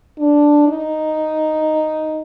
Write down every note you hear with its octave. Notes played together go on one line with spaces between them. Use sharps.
D4
D#4